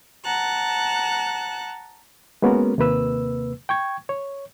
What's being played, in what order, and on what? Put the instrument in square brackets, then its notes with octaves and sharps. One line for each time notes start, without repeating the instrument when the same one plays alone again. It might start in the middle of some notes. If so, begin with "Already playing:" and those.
[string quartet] F#5 A5 A#5 F#6
[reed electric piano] G#3 A#3 B3 C#4 F#4 A#4
D#2 C3 A#3 B4 E6
G5 C#6 G#6
C#5